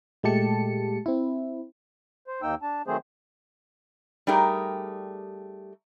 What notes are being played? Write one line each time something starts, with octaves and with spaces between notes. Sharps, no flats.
A#2 G#3 A3 G4 A5 C#7
C4 E4
C5
D#2 A#3 D#4 G5 E6
D4 A5
D#3 F#3 A3 C4 G#4 C5
G3 A3 D#4 G4 G#4 A#4